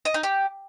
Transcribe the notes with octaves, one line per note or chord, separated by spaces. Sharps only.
D#5
D#4
G4